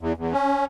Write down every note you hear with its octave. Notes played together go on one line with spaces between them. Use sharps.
E2
E2
C#4